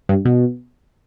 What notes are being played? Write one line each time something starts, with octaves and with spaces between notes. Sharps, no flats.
G2
B2